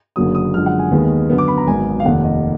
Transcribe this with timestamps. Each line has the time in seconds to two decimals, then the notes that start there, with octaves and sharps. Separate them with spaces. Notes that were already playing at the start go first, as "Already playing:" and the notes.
0.16 F#1 F#2 D3 F#3 A#3 D#6
0.35 D#6
0.54 F#2 D3 F3 G#3 F6
0.66 F#5
0.79 G#5
0.91 D#2 D#3 G#3 B3
1.29 F#2 D3 F#3 B3
1.38 D6
1.48 B5
1.58 A#5
1.67 G#1 G#2 F#3 B3 G#5
2.00 F5
2.05 F1 D#2 D#3 F#5
2.24 D#5